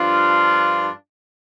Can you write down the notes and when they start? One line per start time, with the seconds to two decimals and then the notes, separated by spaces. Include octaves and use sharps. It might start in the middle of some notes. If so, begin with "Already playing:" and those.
Already playing: G2 F3 D4 F4